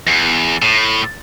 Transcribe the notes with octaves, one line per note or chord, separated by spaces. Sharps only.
E2
A2